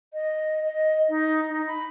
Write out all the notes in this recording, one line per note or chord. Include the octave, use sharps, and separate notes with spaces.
D#5
D#5
D#4
D#4
B5